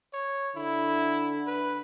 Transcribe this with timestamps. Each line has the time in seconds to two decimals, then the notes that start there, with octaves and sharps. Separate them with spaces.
0.13 C#5
0.56 D3 E4
1.47 B4